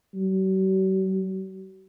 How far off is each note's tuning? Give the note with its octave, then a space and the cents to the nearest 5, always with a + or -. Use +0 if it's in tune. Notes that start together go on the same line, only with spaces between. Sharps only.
F#3 +45